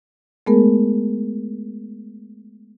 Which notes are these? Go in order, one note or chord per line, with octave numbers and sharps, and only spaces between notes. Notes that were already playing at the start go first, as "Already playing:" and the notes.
G#3 A3 B3 G#4 A#4